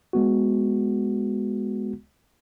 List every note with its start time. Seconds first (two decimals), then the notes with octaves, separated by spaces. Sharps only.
0.13 G#3 B3 F#4